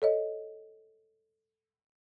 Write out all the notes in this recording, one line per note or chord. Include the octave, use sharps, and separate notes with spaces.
A4 C#5 D#5